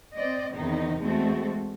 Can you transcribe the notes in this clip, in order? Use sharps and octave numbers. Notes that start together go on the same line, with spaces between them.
C4 D5 D#5
E2 C3 D#3 D#4
E2 G#3 A3 C4 F#4 A4